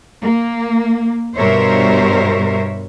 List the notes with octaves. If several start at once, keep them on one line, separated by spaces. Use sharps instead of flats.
A#3
G2 B2 A#4 C5 C#5 E5